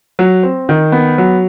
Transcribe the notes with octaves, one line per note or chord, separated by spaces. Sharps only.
F#3
C4
D#3
B3
F#3